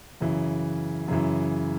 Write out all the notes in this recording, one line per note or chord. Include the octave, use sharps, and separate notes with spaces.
F#2 C#3 E3
F#2 C#3 E3